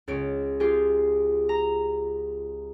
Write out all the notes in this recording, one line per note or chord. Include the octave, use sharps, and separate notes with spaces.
C#2 C#4 D7
F4 G4 G#4
A#5